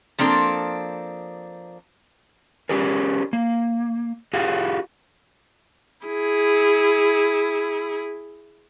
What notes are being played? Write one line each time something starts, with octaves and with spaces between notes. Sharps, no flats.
F3 A#3 C4 D4 A4
C#4 G4 G#4 A#4
A#3
F4 G4 G#4 F5 F#5
E4 G#4